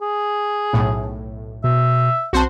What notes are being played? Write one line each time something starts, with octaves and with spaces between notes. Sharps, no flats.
G#4
B1 A2
B2 E5
B1 C4 F#4 C5 A5